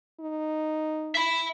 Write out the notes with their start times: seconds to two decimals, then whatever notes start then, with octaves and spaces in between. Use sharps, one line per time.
0.20 D#4
1.15 E5 B5